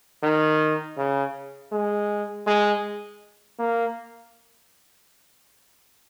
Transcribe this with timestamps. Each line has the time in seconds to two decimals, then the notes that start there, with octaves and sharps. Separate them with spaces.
0.23 D#3
0.98 C#3
1.72 G#3
2.47 G#3
3.59 A#3